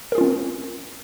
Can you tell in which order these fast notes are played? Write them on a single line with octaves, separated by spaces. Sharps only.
A#4 G#4 F4 C#4 C4